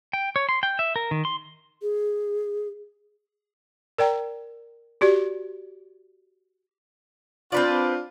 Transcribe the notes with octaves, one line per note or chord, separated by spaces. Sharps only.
G5
C#5
C6
G5
E5
A#4
D#3
C6
G#4
A#4 D5 G5 A#5
F#4 G4 D5
C4 D4 F4 B4 D5